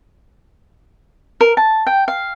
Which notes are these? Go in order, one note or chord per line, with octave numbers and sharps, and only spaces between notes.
A#4
A5
G5
F5